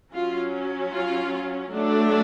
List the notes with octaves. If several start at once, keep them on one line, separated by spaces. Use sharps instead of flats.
F#3 C#4 F4
F4
F#3 A3 D4